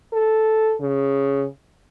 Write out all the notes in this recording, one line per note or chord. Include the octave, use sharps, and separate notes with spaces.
A4
C#3